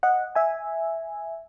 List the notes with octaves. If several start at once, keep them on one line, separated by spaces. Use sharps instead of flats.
D#5 F#5
E5 G#5